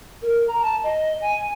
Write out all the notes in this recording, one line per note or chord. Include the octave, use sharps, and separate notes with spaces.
A#4
A#5
A5
D#5
G#5